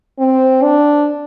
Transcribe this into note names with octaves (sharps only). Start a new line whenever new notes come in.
C4
D4